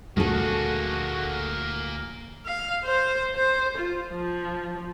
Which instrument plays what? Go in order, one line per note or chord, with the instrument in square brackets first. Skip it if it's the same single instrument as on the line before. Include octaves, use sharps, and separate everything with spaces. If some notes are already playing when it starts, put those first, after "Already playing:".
[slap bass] D2 A#2 F3 [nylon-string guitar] A3 A4 [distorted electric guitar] A#3 G#4 [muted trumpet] F#4
[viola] F5
C5
C5
F4
F3